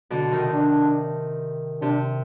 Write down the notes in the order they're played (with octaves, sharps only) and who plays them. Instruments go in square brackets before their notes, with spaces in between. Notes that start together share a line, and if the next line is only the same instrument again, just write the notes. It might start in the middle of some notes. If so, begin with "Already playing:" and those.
[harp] B2 D3
C3 D#3
[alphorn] D4
[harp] C3 [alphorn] D4